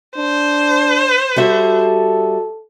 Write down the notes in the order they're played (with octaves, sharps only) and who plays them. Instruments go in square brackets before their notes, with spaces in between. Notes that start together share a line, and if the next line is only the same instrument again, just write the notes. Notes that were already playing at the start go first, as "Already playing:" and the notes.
[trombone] D4 [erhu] C5
[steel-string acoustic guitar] G3 F#4 E5 [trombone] A4